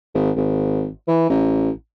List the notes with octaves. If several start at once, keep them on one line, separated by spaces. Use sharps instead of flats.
G#1
G#1
E3
A1